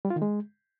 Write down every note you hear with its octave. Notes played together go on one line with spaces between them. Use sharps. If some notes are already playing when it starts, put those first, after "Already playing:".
G3
F4
D#3
G#3